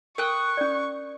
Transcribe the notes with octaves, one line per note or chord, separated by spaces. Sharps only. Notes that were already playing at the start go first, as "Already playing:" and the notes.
A#4 G5 C#6 D#6 F#6
C#4 D5